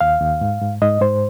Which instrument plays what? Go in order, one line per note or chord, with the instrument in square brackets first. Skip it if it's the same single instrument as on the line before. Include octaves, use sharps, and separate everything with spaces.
[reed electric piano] D#2 F5
D#2
G#2
G#2
G#2 D#5
G#2 C5